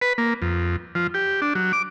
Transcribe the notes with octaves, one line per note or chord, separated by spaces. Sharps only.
B4
A#3
F2
F3
G4
D4
F#3
D6